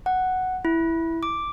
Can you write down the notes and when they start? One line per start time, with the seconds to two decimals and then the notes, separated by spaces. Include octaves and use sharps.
0.06 F#5
0.65 E4
1.23 D6